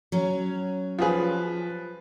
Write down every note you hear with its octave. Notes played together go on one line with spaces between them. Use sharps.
F#3 C#4
F3 F4 G4 G#4 B4